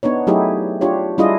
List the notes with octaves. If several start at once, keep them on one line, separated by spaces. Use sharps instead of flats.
B3 D4 D#4 C#5
F#3 A3 D#4 E4 G4 G#4
D4 F4 G4 C#5
G3 D4 E4 F4 G#4 D#5